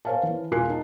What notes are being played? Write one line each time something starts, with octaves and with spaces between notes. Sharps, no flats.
A#4 C5 C#5 F5 G#5 A5
E3
E1 F4 A#4 G#5 F#6 C7
D#4 A5